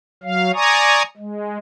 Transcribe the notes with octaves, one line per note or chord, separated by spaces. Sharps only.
F#3 F5
D5 G#5 A#5 C#6 D#6
G#3